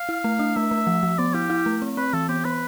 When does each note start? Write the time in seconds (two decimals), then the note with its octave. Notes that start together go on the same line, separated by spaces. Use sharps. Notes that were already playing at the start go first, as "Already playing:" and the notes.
Already playing: F5
0.09 E4
0.24 A3
0.39 D4
0.56 A3 E5
0.71 A3
0.87 F3
1.03 F3
1.18 B3 D5
1.34 E4 G4
1.50 E4
1.66 A3
1.82 C4
1.97 C4 B4
2.13 E3 A4
2.29 B3 G4
2.44 B3 B4